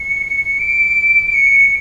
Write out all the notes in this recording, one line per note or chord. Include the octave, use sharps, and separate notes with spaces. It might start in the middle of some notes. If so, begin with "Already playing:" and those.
Already playing: C#7
D7
D7
C#7